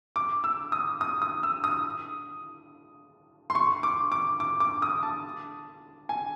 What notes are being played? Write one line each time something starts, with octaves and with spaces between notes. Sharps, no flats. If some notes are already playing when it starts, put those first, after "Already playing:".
D6
E6
D#6
D#6
D#6
E6
D#6
C6
C#6
D6
D6
D6
D6
D#6
A5
G#5